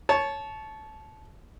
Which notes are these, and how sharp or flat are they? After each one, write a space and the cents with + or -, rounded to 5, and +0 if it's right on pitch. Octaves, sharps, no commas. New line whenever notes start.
C#5 +0 A5 -20